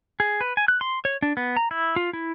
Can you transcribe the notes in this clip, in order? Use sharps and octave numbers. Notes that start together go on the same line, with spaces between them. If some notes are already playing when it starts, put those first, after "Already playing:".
G#4
B4
G#5
F#6
C6
C#5
D4
B3
A#5
E4
F4
E4